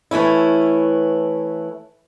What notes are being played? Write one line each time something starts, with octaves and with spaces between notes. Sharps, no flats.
E3 A3 C#4 E4